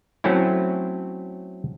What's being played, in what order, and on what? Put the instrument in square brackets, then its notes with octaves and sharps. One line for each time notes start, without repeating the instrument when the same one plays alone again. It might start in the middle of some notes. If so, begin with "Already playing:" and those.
[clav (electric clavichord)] F#3 A3 C4 C#4 E4